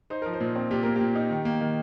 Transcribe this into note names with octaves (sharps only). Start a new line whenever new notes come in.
D#4 C5
F3 A#4
C5
A#2
C4
A#2 G4
A#3 A#4
A#2 G4
D#4
D#3
A#3
D#3